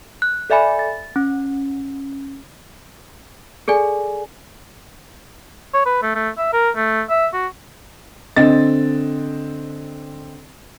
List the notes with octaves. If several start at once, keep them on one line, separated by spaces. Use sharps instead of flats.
F#6
A4 D5 E5 G#5 B5
A6
C#4
G#4 A4 D5 G#5
C#5
B4
A3
A3
E5
A#4
A3
E5
F#4
D3 C4 D#5 A6